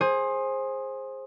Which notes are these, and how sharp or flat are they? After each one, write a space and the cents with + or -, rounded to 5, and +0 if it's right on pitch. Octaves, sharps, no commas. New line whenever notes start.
G#4 -5 C5 +20